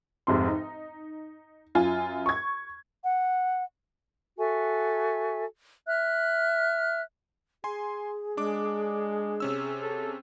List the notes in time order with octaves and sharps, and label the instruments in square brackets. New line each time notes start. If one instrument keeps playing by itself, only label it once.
[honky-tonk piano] F1 G#2 C3 C6
D#4
F#2 F4 G#5
C#6 G#6
[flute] F#5
[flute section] F#4 A4 E5 G#5
E5 F6 F#6
[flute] G#4 [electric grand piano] G#5 C6
[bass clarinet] G#3 [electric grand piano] D4 D6
[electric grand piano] C3 C#4 E6
[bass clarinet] A4